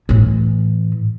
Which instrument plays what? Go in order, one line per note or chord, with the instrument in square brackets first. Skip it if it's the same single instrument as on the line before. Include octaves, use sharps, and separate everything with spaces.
[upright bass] A2 E3